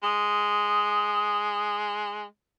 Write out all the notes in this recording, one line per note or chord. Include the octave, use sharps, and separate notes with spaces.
G#3 D#6